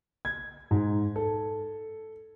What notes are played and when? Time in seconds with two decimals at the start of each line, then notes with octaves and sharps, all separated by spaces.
0.25 G#6
0.71 G#2
1.16 A4